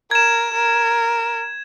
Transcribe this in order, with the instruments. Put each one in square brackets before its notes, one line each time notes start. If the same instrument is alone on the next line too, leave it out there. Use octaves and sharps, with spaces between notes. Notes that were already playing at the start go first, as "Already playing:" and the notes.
[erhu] A#4 [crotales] G#6 E7
[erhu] A#4